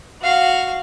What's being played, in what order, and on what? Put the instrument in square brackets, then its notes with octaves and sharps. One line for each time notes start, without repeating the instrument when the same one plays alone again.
[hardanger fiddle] F#4 F5